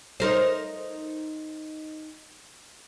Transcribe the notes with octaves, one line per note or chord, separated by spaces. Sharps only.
D#4 A#4 C5